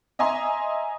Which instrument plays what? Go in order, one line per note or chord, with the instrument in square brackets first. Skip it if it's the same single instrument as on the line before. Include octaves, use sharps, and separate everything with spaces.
[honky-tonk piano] D#5 E5 G#5 A#5 C6